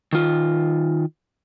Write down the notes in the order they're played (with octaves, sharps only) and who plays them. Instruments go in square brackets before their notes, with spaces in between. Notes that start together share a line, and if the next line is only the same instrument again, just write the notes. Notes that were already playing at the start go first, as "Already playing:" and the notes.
[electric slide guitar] D#3 F4